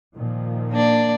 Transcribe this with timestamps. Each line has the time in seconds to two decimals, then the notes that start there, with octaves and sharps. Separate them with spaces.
0.15 A#2 D#3 F3
0.71 A#3 D4 D5